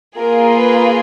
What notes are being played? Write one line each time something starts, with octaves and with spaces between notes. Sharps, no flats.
A#3 F4 G#4 A#4
B4